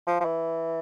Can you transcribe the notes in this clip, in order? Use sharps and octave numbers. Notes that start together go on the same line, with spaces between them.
F3
F3
E3